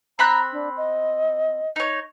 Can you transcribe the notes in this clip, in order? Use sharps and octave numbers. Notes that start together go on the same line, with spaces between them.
C4 A#5 B5 F#6
D4
D#5
D#4 C#5